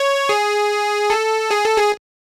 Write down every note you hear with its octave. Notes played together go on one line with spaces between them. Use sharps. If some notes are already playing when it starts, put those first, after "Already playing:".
Already playing: C#5
G#4
A4
G#4
A4
G#4